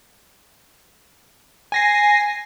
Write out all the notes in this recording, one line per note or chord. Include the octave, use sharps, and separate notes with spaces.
G#5 A#6 C7